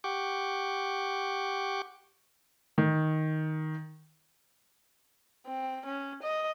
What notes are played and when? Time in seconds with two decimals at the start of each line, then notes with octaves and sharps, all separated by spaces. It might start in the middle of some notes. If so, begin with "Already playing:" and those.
0.04 G4 F#5 G5 C#6 D6
2.78 D#3
5.47 C4
5.85 C#4
6.22 D#5